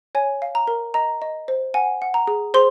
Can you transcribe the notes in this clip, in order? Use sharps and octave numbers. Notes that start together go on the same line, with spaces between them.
C#5 G#5
F5
A#5
A#4
D#5 A#5
D#5
C5
F#5 G#5
F#5
A#5
G#4
G#4 C5 C6